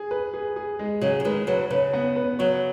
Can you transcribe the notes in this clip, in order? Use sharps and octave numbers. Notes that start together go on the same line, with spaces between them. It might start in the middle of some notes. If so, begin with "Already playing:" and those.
Already playing: G#4
B4
G#4
G#4
G#3
C#3 F#3 G#4
F#3
D#3 G#3 B4
C#3 F#3 B4
C#3 B4
B3
B4
C#3 F#3 C#5